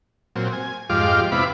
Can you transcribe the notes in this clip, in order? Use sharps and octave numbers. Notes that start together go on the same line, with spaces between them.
A#2 F#3 C4
G#5
F2 G#2 F4 G4 F5 D6
C3 B3 E4 F4 B5 D6